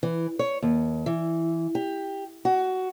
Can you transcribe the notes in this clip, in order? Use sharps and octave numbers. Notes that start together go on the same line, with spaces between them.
E3
C#5
D#2
E3
G4
F#4